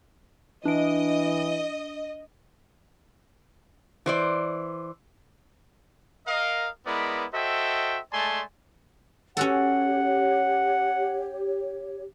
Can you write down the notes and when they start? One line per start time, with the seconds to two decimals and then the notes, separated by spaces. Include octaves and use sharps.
0.65 E3 D4 D#5 D7
4.06 E3 C5 D5
6.27 A#4 D#5 F5
6.86 G#3 B3 E4 A#4 B4 D5
7.34 F#4 A4 C5 D#5 E5 G5
8.12 G#3 A3 D5 G#5 A5 C6
9.37 C#4 F#4 G4 A4 C#5 F#5